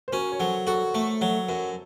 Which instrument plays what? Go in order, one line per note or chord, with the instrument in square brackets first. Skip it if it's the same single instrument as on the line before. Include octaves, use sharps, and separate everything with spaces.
[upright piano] C5
[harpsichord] C#4 [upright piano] F#4 A#4
[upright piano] C#5
[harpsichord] F#3 [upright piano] A4 C5
[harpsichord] F#4 [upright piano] A4
[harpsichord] A3
F#3
F#2